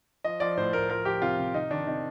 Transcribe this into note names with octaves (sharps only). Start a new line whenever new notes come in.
F3 D#5
F3 D5
A2 C5
A2 A#4
F3 A#4
F3 G4
C3 F4
C3
C3 D#4
D#3 D4
C3 D#4